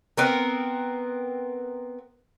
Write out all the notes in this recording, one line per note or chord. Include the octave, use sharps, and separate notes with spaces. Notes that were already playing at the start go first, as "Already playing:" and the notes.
B3 C4 A#4